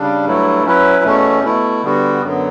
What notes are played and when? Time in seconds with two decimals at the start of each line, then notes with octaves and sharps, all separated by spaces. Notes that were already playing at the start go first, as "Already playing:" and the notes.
Already playing: C#3 G3 D4
0.25 G2 F#3 A3 E4
0.64 F#3 C#4 E4 B4
1.03 E2 B2 A3 C#4
1.42 B2 A3 E4
1.83 D3 G3 B3 F#4
2.22 F#2 D3 F#3 B3